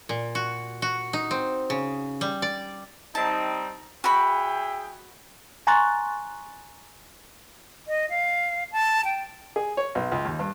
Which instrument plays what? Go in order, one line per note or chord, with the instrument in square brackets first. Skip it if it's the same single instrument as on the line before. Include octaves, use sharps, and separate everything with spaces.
[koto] A#2
F#4
F#4
D#4
C4
C#3
G3
D5
[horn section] G3 C4 D#4 [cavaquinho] A5
[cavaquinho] F#4 B5 [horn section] G#4 E5 G5
[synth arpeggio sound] G#5 A#5 C6 C#6 F#6 A6
[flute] D#5
F5
A5
G5
[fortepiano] G#4
C#5
B1
C#2
D#2
G2